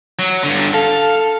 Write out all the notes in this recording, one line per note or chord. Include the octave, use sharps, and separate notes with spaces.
F#3
G2 D3
A4 F5